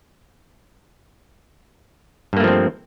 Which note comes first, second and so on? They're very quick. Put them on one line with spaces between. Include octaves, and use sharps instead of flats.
G2 A#3 A3 F3 C4